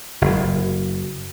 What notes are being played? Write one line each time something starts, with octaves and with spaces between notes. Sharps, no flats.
F#1